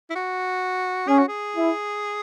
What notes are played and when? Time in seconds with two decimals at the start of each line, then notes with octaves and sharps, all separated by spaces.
0.10 E4
0.15 F#4
1.07 C#4 G#4
1.18 F#4
1.28 G#4
1.55 E4